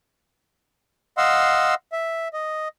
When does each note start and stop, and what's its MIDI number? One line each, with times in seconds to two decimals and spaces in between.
1.18 1.74 75
1.18 1.74 77
1.18 1.74 78
1.18 1.74 84
1.18 1.74 88
1.93 2.28 76
2.34 2.68 75